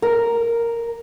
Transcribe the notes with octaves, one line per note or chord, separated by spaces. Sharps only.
A#4